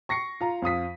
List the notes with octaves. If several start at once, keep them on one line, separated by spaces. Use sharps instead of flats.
C#6 A#6 C7 C#7
F4 A#5
F2 F5 D#6 B6